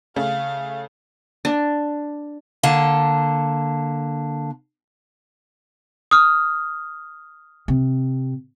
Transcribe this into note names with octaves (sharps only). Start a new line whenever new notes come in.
C#3 A3 F5
D4
D3 A#3 A5
D#6 F6
C3